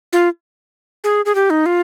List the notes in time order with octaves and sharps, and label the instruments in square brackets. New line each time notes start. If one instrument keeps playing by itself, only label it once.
[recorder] F4
G#4
G#4
G4
D#4
F4